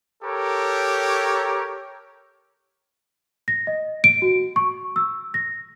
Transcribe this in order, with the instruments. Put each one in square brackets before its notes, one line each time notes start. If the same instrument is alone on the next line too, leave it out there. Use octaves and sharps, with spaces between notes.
[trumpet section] G4 A4 A#4 C#5
[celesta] A#6
D#5
D7
F#4
C#6
E6
A#6